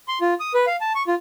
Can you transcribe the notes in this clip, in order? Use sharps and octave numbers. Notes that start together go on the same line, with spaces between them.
C6
F4
D#6
B4
F5
A5
C#6
F4